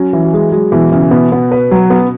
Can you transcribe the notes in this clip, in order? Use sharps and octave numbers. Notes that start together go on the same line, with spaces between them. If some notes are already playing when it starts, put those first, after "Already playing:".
Already playing: F#3 C#4
E3
F#3
G#3
F#3 G#3
B2 E3
C#3 E3
B2 B3
B3
B4
F#3
B3